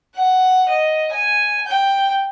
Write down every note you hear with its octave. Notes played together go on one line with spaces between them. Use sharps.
F#5
D#5
G#5
G5